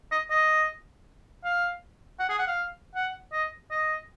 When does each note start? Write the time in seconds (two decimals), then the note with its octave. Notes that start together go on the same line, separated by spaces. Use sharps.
0.12 D#5
0.30 D#5
1.44 F5
2.20 F#5
2.29 G#4
2.39 F#5
2.48 F5
2.95 F#5
3.32 D#5
3.71 D#5